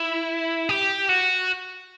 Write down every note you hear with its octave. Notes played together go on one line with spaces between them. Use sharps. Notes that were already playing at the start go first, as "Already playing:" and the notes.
Already playing: E4
G4
F#4